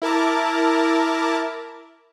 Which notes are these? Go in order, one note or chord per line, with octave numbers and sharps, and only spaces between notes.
E4 A#4 A5 D6